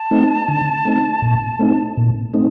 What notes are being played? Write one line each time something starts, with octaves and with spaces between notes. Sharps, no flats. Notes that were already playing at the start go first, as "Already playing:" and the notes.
Already playing: A5
A3 C4 D#4
D3
A3 C4 D#4
A#2
A3 C4 D#4
A#2
A3 C4 D#4